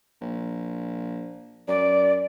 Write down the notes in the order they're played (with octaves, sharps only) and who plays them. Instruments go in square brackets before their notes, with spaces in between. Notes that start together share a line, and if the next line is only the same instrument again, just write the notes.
[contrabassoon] A#1
[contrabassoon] F#2 [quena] D5